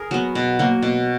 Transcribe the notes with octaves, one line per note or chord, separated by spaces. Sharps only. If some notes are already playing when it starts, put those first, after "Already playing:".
Already playing: G#4 A#4
F#3 B3
B2
F#3 A#3
B2